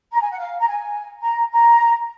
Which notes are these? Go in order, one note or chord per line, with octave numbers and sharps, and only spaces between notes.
A#5
G#5
F#5
F5
A#5
G#5
A#5
A#5